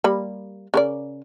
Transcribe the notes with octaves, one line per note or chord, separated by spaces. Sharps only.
G3 A#3 B5
C#3 A#4 D5